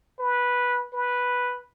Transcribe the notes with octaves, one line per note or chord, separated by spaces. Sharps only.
B4
B4